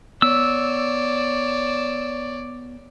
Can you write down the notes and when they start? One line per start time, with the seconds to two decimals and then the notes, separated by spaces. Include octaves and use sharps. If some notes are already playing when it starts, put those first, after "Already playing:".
0.22 B3 C#5 D5 E6